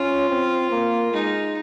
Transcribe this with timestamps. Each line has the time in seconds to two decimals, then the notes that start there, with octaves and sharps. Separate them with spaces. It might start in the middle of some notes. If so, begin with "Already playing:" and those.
Already playing: C#4 F4
0.30 C4
0.71 A#3
1.13 G#3 D#4